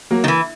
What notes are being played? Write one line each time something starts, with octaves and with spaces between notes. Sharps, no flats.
F#3 A#3
D#3
E3